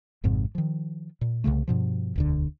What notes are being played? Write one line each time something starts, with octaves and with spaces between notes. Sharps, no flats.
G#1 F2 G#2 C3
D#3 F3
A#2
C2 F2 C#3 A3
G2 B2 F3
E1 D2 D3